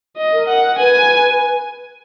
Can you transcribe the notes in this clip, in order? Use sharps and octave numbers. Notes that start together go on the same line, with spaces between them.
D#5
A#4
F#5
B4 G#5